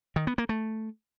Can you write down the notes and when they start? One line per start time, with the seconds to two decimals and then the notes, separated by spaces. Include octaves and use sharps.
0.16 D#3
0.27 B3
0.38 A#3
0.49 A3